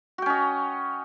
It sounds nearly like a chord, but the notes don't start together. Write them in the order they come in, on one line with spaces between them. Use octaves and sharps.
F#4 G5 C#4 D#5